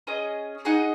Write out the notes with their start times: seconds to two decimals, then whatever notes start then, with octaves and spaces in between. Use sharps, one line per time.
0.07 C#4 G#4 D#5
0.65 D#4 G#4 D#5 F#5